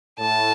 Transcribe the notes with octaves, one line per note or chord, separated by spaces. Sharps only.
A2 A5